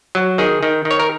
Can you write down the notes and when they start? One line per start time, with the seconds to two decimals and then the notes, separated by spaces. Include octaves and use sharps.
0.15 F#3
0.38 D#3 G#4
0.63 D#3
0.85 D#3
0.91 C#5
0.99 A#4